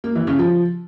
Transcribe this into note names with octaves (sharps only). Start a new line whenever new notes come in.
A#3
E3
C#3
F3